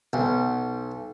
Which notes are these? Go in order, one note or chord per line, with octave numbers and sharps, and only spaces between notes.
B1